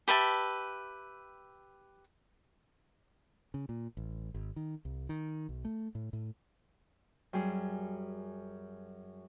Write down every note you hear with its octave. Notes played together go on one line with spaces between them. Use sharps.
G4 B4 E5 A5
C#3
A#2
A1
G#1
D#3
C2
D#3
B1
A3
A2
A2
F#2 G3 G#4